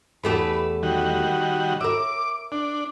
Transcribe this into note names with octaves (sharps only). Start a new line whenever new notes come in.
E2 A3 G4 B4
D#3 G3 F#4
A#4 E5 D6
D4